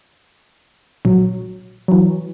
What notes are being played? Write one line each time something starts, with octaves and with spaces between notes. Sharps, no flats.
A#1 F#3
E3 F#3